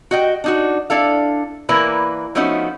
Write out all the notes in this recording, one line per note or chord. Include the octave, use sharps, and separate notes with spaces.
F#4 D#5 G5
D4 D#4 F#4
D4 E4 A4 F5
E3 A#3 E4 A#4 B4 D5
F3 A3 B3 C#4 D#4 F#4